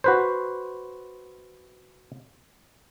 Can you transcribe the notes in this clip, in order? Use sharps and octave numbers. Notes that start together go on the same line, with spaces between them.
F#4 B4 C5